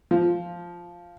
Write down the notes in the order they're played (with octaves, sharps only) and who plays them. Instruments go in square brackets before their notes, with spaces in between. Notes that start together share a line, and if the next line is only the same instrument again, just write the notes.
[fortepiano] F3